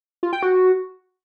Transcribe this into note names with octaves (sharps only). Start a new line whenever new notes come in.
F4
G5
F#4